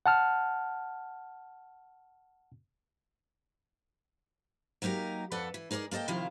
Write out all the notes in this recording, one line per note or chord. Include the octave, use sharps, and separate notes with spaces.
F#5 A5 F6
F#3 A#3 D#4 G4 A#4
F2 A4 B4 D5 F#5
E3
D#4 G#4 A#4 C5 D5
A#3 A4 B4 D#5 G5
C3 D#3 F3 E4 F4 A#4